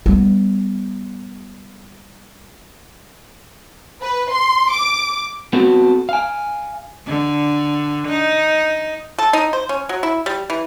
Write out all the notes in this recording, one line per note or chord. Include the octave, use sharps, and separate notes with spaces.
G3 B3
B4
C6
D6
B3 C4 F#4 A4
F5 G#5
D3
D#4
A4
D#4
C5
C#4
F#3
E4
G3
E3